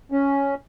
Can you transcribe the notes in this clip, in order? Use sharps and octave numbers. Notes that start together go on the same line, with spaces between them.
C#4